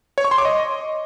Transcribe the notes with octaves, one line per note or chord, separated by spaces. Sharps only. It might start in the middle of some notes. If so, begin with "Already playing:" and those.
C#5
C#6
C6
D6
D#5